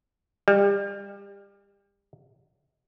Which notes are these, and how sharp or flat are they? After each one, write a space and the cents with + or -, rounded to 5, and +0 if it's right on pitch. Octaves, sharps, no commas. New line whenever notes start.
G3 +30